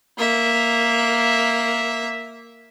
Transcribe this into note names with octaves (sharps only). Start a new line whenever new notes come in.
A#3 E5